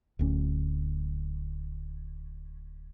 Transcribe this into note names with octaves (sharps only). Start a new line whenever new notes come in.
D1 D2 C#4